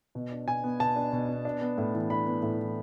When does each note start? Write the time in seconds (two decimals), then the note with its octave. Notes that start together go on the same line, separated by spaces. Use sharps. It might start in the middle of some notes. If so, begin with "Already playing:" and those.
0.15 B2
0.32 D4
0.47 B2 G#5
0.64 B3
0.80 B2 A5
0.96 D4
1.12 B2
1.28 B3
1.45 D4
1.61 B3
1.78 A2
1.94 E3
2.10 D4 B5
2.26 B3
2.43 A2
2.59 E3